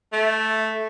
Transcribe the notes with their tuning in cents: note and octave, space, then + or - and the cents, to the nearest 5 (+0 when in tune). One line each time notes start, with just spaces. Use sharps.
A3 -5